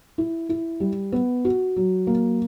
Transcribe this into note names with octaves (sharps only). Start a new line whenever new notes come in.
E4
E4
G3
B3
F#4
F#3
A#3